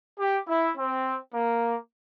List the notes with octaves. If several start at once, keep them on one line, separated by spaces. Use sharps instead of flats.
G4
E4
C4
A#3